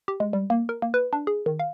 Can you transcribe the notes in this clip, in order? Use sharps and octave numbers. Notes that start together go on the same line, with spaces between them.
G4
G#3
G3
A#3
A#4
A#3
B4
D4
G#4
D#3
F5